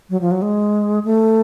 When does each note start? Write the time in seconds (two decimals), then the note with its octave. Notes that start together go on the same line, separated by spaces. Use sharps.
0.10 F#3
0.21 F3
0.31 F#3
0.42 G#3
1.05 A3